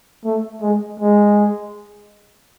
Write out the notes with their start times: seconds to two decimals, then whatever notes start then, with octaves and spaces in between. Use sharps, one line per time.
0.24 A3
0.62 G#3
1.00 G#3